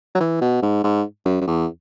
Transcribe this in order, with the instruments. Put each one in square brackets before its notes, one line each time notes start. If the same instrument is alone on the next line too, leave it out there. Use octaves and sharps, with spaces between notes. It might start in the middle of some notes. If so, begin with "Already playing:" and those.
[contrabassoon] F#3
E3
B2
G#2
G#2
F#2
F#2
E2